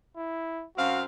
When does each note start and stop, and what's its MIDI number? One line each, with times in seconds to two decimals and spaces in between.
0.17 0.66 64
0.77 1.03 42
0.77 1.03 60
0.77 1.00 66
0.77 1.03 77